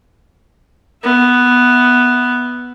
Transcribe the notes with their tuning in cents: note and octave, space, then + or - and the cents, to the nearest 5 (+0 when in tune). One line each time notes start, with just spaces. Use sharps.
B3 +0 E5 +0